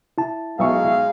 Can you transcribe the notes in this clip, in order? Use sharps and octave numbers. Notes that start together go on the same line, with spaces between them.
E4 A5
B1 G#3 D#4 E5 F5 C#6